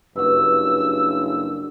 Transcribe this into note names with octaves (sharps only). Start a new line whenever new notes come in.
F#1 G2 F#4 E6